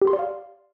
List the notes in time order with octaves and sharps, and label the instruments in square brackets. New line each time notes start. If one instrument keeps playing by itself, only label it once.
[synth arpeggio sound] G4
C6
D5
F5